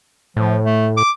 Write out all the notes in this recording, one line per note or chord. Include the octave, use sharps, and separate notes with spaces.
A2 F3
A3
D6